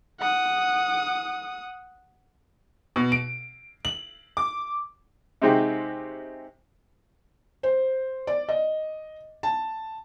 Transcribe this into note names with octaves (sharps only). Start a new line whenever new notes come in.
F#5 D#6
B2
D7
F#7
D6
C3 G#3 C4 D#4 F#4 G4
C5
D5
D#5
A5